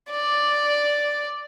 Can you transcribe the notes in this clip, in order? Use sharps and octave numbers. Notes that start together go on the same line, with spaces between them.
D5